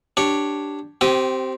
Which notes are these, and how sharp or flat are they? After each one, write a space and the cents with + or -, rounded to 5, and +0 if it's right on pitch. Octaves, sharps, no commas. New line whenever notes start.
D4 +0 G4 +0 C#5 +0
C4 +0 G4 -25 D#6 +0